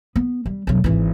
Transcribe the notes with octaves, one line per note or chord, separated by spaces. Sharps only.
B3
G3
E1 F#3
G#1 E3